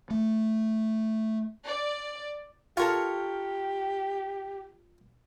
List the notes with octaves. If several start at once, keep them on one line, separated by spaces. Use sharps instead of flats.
A3
D5
F4 G4 A4 A#4 C#5